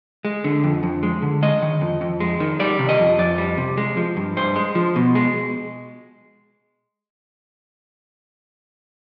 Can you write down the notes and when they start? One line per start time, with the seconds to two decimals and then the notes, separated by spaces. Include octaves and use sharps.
0.25 G#3
0.44 D3
0.64 F2
0.83 F2
1.03 G#3
1.22 D3
1.42 G#3 D#5
1.62 D#3
1.81 F2
2.01 F2
2.20 G#3
2.40 D#3
2.60 G3 D5
2.79 C3
2.89 D#5
2.99 F2
3.19 F2 D5
3.38 G3
3.57 C3
3.77 G#3
3.97 F3
4.17 G2
4.37 G2 C5
4.56 G#3
4.75 F3
4.96 B2
5.15 G#3